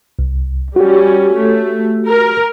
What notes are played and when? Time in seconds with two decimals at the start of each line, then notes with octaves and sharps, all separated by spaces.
0.19 C2
0.76 G3 C#4 F#4 G4
1.35 A3
2.08 A#4